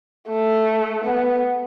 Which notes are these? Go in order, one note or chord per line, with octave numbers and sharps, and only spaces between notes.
A3
B3